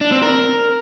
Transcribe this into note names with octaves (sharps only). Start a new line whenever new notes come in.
D4
C4
A#4